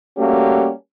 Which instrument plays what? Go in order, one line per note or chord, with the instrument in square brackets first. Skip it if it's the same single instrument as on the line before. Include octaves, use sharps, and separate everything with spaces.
[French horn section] G3 A3 A#3 C#4 F#4 G4